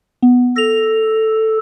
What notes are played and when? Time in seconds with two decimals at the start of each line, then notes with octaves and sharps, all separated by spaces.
0.22 B3
0.56 A4 A#6 F7